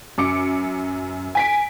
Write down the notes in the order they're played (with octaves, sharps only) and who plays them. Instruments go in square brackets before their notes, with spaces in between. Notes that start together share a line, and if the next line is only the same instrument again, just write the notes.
[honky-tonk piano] F#2 D6 C#7
G#5 B6 D7